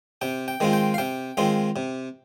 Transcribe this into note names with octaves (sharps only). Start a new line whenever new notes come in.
C3 G5
G5
D#3 G#3 C4 F4
G5
F5
C3 G5
D#3 G#3 C4 F4
C3